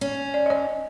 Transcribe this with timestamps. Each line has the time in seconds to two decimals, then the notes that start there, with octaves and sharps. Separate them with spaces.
0.01 C#4
0.34 D5
0.46 C#5 D#5